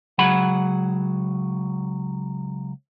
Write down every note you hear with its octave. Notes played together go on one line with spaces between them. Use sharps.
C#2 F#3 G#4 F#5 B5